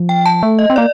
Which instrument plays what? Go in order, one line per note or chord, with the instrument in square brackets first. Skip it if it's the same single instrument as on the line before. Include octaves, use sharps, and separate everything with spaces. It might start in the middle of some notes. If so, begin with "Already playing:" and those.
Already playing: [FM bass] F3
[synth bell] G5
A5
[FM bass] A3
[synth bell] D#5
[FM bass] C4
[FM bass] A#3 [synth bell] D5